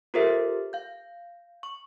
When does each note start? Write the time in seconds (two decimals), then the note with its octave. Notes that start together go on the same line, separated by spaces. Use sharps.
0.14 F4 G4 A4 A#4 C5 E5
0.73 F5 G6
1.63 C#6